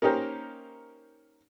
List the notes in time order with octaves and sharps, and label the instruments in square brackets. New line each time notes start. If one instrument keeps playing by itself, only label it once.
[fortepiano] A#3 C#4 D#4 G4 A#4 C5